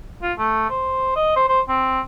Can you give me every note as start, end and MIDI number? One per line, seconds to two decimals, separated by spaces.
0.22 0.33 65
0.38 0.68 57
0.70 1.11 72
1.16 1.35 75
1.36 1.47 72
1.48 1.60 72
1.68 2.00 60